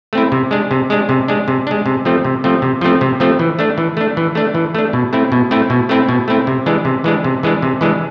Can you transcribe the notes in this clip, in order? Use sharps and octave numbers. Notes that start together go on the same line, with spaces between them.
A3 C4 E4
C3
G#3 D4
C3
G#3 D4
C3
G#3 D4
C3
G#3 D4
C3
F3 A3 C4
C3
F3 A3 C4
C3
F3 A3 C4
C3
F3 A3 C4
E3
A3 D4
E3
A3 D4
E3
A3 D4
E3
A3 D4
B2
A3 C4 E4
B2
A3 C4 E4
B2
A3 C4 E4
B2
A3 C4 E4
C3
E3 G#3 D4
C3
E3 G#3 D4
C3
E3 G#3 D4
C3
E3 G#3 D4